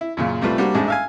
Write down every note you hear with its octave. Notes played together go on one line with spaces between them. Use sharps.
E4
F#2 A#2 C#3
C2 G3 A3 F4 B4
G3 A#3 C4 D4 F#4
A1 G#2 D4 G#4
E5 F5 G#5